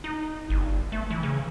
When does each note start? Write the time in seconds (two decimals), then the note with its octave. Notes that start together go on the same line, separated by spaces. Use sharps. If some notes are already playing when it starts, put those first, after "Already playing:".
0.04 D#4
0.50 G1
0.92 A3
1.10 E3
1.23 C#3